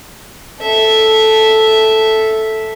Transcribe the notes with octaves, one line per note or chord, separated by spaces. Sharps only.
A4 E5